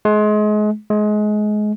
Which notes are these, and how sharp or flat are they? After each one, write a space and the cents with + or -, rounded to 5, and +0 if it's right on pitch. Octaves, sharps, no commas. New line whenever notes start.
G#3 +30
G#3 +25